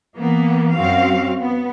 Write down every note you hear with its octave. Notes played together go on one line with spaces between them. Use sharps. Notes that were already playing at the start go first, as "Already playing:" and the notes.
E3 A#3 B3
F#2 C4 F#4 F5
B3